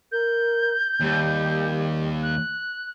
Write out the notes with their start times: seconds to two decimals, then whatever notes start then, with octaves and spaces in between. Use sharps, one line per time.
0.11 A#4 G6
1.01 D#2 G3
2.22 F#6